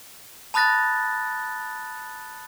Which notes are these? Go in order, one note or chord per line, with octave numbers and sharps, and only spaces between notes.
A5 B5 D#6 F#6 A6 A#6